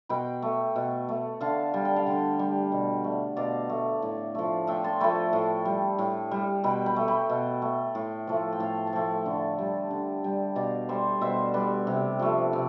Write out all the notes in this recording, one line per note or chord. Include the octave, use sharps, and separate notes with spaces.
B2 G5 B5
A3
B2
A3
D3 F5 A5
G3 A5
G5
F5 A5
D3
G3
B2
A3
B2 D5 F5
A3
A2
F3 A3
A2 E5 G5
A5 C6
F3 A3 G5 B5
A2
G3
A2
G3
B2 G5 B5
G5 B5
A3
G5 B5
B2
A3
A2
F3 A3
G5
A2 F5 A5
A5
F3 A3 E5 G5
D3
G3
D3
G3
B2 D5 F5
G3 C5 E5
B2 C5 E5
G3 B4 D5
C3
F3 A3
C3